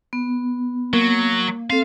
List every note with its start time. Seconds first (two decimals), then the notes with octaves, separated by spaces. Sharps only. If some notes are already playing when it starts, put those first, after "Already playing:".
0.13 B3
0.93 F#3 A#3
1.70 C4 A4 F5